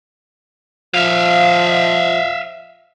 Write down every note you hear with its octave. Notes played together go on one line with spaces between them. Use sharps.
F3 E5 F5